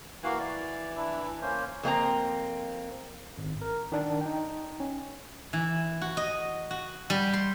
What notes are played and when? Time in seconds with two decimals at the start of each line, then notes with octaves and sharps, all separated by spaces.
0.24 E3 A#3 F#4 F5
0.40 D5
0.96 D4 E4
1.42 A#3 C#4 C5
1.83 F2 A#3 C4 A#5
3.38 G#1
3.62 A#4
3.92 D#3 D4
4.21 D#4 G5
4.80 C#4
5.53 E3
6.01 F#4
6.17 D#5
6.71 F#4
7.10 G3
7.33 C6